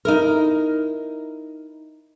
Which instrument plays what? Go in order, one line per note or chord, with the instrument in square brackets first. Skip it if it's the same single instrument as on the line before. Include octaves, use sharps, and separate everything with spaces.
[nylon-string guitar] D#4 E4 A#4